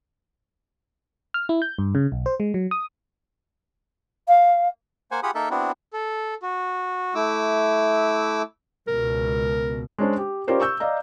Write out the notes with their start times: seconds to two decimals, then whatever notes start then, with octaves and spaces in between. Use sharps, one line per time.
1.34 F6
1.49 E4
1.62 G6
1.78 G2
1.95 C#3
2.12 B1
2.26 C5
2.40 G#3
2.54 F#3
2.71 D#6
4.27 F5
5.11 A#3 C5 F#5 G#5
5.23 F4 G4 G#4 F#5 B5 D#6
5.35 A#3 D#4 A4 A#4 E5
5.51 B3 C4 D4 E4 F#4
5.93 A4
6.43 F#4
7.15 A3 E4 D6 E6
8.88 C#2 B2 A#4
9.98 G#3 C#4 D4 C5
10.18 G4
10.47 C#4 F4 G4 A#4 C5 D5
10.60 C#6 E6 G6
10.80 D5 D#5 F5 A#5